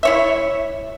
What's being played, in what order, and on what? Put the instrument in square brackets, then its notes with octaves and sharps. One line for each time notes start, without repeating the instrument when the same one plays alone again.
[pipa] E4 C#5 E5